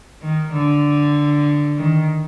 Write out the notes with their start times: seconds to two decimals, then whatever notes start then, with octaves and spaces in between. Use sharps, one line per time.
0.22 D#3
0.54 D3
1.77 D#3